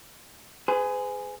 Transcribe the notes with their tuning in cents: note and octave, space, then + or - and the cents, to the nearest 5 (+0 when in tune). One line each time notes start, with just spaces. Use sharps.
G#4 +0 B4 +45